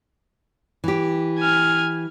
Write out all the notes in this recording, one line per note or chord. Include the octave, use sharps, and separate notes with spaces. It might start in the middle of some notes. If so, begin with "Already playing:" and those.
E3 G4
G#5 F6